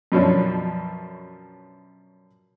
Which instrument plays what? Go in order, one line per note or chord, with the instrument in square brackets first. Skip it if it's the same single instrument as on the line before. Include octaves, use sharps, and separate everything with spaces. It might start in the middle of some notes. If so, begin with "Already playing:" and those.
[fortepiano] F#2 B2 F3 C#4 D4